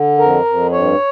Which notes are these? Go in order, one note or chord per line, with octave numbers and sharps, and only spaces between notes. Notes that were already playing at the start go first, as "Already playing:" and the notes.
Already playing: D3
F2 A#4
F2
G2 C#5